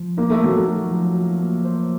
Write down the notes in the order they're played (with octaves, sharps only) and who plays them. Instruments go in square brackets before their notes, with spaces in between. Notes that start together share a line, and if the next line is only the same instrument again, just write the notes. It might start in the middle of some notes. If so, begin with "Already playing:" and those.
Already playing: [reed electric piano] F3
[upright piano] A#3 [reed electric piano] D#4
[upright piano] A3
[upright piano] F#3 [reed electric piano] A#3
[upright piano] A3
[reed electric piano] F#4
F3
F4
A#3
C5